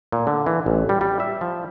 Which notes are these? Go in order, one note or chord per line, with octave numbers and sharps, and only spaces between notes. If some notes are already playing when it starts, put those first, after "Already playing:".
A#2
D3
E3
A1
G3
G3
E5
F3